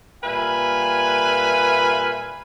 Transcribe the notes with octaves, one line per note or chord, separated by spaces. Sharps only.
A#2 G3 B4 E5 F5 G#5